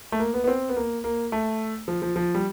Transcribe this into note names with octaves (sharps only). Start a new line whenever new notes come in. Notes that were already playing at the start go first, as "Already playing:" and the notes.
A3
A#3
B3
B3
C4
B3
A#3
A#3
A3
F3
F3
F3
G3